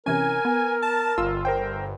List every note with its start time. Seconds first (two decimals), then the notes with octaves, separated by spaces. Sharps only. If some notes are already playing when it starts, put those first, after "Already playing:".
0.06 C3 E3 C#4 A#4 G#5
0.45 B3
0.82 A5
1.18 G1 F4 E6
1.45 A#4 C5 G5